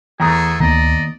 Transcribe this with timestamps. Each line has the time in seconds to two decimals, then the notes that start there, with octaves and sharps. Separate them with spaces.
0.20 E2 A3 G#4 A#5 D#6
0.60 D2 D#3 A#3 B3 D5 D#5 A#5